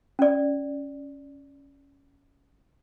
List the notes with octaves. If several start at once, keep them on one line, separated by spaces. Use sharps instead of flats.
C#4 D5